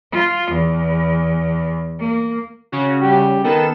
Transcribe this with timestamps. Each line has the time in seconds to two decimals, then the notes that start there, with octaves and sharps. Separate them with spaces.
0.12 F4
0.51 E2
2.00 A#3
2.72 C#3 C#4 F#4
3.02 G3
3.44 D#3 B3 A4 E7